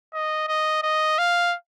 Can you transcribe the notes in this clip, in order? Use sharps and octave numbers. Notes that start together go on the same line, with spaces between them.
D#5
D#5
D#5
F5